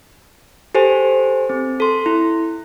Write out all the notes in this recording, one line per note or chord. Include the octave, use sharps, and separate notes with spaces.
G4 A4 C5 G#5
C4
A4 C6
E4